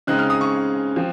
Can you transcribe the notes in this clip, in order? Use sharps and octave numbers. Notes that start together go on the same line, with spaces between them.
C#3 G#3 C4 D#4 F#6
F6
D#6
C#6
F3 C4